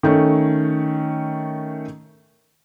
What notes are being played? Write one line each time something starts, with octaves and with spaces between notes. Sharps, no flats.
D#3 A3 C#4